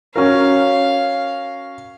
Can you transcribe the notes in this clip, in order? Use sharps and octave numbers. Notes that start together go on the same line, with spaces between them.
C#4 F#4 A#4 F5